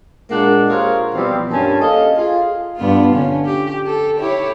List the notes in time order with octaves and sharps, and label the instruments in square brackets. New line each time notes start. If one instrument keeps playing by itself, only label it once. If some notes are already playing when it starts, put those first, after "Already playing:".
[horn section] A#2 G#3 A#3 D4 F#5
F4 G4 G#4 A#4 C5 C#5
B2 E3 F3 G3 C4
G2 G3 A#3 C#4 G#5 A5
A4 D#5 F5
F4 G#4
[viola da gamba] G2 B3 F4
D3 C#4
G4
A4
E4 G4 C#5